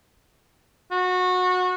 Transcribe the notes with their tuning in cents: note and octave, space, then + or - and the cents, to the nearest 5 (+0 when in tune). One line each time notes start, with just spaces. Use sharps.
F#4 -20